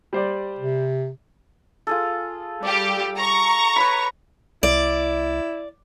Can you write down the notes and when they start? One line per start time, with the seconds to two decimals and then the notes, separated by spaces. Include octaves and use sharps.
0.13 G3 C5 D5
0.59 C3
1.87 F4 G#4 A4
2.63 G3 G4 D5
3.16 A#5 C#6
3.76 B4 C#5 B5
4.63 C2 E4 D5